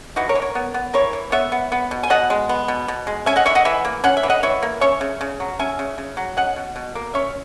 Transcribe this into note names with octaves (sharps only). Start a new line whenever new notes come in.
E3 D#4 F#4
A#4 C#5
E3
A#4 C#5
B3
B3
E3 A#4 C#5
E3
B3 C#5 E5
B3
B3
B2
G#5
B2 D#5 F#5
G#3
B3
B2
B2
G#3
C#4 E5 G#5
D#5 F#5
E3 C#5 E5
D#5 F#5
E3 E5 G#5
A#3
C#4 F#5
E5
E3
D#5 F#5
E3 C#5 E5
A#3
C#4 C#5 E5
C#3
C#3
F#3
C#4 E5 G#5
C#3
C#3
F#3
C#4 D#5 F#5
B2
B2
A#3
C#4 C#5 E5